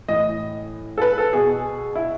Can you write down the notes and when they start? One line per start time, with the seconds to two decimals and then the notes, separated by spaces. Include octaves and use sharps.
0.08 A2 E3 D#5
0.98 A4
1.02 B4
1.18 A4
1.33 B2 G#4
1.95 E4